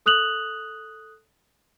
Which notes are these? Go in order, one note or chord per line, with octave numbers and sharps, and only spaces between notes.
A4 D#6 F#6 F7 F#7